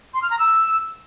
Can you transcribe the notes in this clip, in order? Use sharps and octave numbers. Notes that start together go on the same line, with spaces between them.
C6
F6
A#5
E6